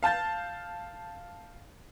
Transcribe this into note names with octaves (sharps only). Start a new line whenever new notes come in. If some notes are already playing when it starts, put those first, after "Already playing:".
F5 A5 G6 A6